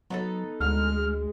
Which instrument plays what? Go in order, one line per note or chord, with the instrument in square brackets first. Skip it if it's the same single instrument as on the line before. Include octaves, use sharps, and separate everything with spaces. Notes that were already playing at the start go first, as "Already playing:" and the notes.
[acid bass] F#3 [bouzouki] B3 D#4 A4
[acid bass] D2 [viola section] G#3 [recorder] F6